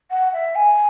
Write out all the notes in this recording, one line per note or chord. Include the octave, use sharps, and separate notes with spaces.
F#5
E5
G#5